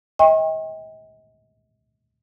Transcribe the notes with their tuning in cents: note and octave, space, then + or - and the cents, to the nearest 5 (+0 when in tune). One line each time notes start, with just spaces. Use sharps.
D#5 +40 G5 +30 C#6 -40